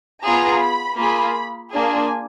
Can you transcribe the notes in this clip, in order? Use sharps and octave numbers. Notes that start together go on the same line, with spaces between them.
B3 F4 G#4 A#5
B5
A#3 F4 G#4 B5
A#3 D4 F4 G#4 G#5